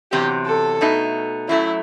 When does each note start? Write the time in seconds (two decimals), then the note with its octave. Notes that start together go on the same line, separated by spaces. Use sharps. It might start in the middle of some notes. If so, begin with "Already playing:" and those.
0.12 E2 C3 F#3 G4
0.46 A4
0.81 B2 A3 D#4
1.49 F#2 F#3 A3 E4